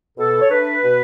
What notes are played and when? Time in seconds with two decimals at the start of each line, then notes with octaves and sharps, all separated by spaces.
0.18 B2 A4
0.42 C#5
0.51 A3 D4 B4
0.83 B2